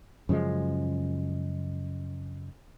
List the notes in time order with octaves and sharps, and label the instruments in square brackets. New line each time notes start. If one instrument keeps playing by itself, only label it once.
[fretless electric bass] F#2 C#3 F3 G#3